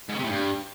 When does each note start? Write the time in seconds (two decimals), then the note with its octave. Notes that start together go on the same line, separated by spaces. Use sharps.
0.09 G#2
0.14 C#3
0.19 C3
0.24 A2
0.29 G2